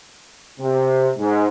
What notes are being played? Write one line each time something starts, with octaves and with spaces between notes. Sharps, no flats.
C3
G#2